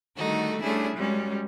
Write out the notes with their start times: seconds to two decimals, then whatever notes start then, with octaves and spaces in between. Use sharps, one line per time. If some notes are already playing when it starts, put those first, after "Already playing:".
0.18 D3 D#3 G3 A3 D#4 F#4
0.63 G3 A3 C#4 D4 E4 G#4
0.96 F#2 G3 G#3 C#4